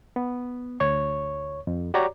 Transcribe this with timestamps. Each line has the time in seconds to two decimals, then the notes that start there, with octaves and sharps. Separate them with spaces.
0.16 B3
0.80 D2 C#5 C#6
1.67 F2
1.94 F#4 G4 C#5 D5 A#5 D6